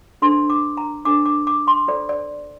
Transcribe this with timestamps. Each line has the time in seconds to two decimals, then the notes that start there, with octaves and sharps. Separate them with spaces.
0.22 D4 A4 C5 C6
0.50 D6
0.77 A#5
1.05 D4 A4 C5 D6
1.26 D6
1.47 D6
1.67 C6
1.88 F4 A4 C5 D5
2.09 D5